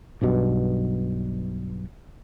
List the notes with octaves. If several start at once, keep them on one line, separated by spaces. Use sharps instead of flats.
B1 G2 B2